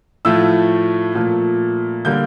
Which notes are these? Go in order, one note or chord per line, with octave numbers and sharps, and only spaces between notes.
A2 F3 A3 E6
A#2 F3 A3
D3 G3 A#3 G6